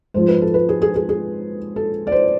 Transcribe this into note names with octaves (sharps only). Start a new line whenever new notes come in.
G#2 F3 G#3 C5
B4
A4
B4
G#4
G#4
G#4
G#4
A4
D5
C5